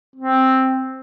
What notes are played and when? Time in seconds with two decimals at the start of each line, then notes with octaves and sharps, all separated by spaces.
0.16 C4